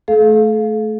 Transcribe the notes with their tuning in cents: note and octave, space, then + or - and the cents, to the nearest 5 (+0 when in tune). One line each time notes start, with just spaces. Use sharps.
A3 -15 A4 -40 F5 +0